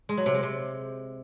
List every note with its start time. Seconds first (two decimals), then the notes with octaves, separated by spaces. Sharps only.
0.09 G#3
0.18 F#3
0.26 C3
0.34 G#3
0.43 C3